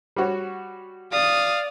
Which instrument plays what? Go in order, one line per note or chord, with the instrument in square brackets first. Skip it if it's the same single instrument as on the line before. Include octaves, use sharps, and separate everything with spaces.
[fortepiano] G3 F#4 C#5
[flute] D5 [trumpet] F5 [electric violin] D#6